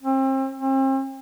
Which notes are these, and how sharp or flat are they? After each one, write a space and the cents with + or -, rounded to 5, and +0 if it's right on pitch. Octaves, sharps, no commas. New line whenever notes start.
C4 +35
C4 +40